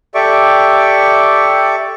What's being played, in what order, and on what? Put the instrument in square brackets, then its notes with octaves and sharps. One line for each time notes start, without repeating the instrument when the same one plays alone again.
[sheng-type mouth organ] G4 A4 D5 E5 C#6 D6